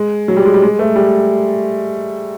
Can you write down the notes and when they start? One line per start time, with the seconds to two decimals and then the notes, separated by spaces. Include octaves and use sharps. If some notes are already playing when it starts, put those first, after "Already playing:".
Already playing: G#3
0.28 F#3
0.37 G3
0.45 G#3
0.54 G3
0.62 G#3
0.79 A3
0.96 G3